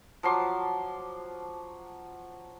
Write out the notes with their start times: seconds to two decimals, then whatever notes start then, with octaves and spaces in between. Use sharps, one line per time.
0.23 F3 F#3 C6 D6